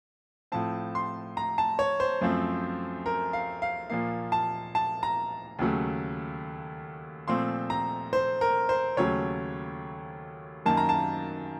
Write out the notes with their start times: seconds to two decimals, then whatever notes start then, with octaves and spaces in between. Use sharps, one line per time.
0.52 A2 F3 C4 A5
0.95 C6
1.37 A#5
1.58 A5
1.79 C#5
2.00 C5
2.21 F#2 F3 A3 C4
3.06 A#4
3.33 F5
3.62 F5
3.90 A#2 F3 A#3 F5
4.32 A5
4.75 A5
5.03 A#5
5.59 D#2 C#3 F#3 A3
7.28 A#2 F3 A3 C4 C6
7.70 A#5
8.13 C5
8.41 A#4
8.69 C5
8.97 D#2 C#3 F#3 A3 C#5
10.66 F#2 D#3 A#3 A5
10.77 A#5
10.89 A5